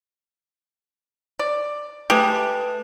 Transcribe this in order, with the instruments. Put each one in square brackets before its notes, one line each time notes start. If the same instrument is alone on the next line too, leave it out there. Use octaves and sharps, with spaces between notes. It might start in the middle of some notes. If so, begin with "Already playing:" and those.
[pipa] D5
[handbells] A3 B4 A5 [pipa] G4 G#4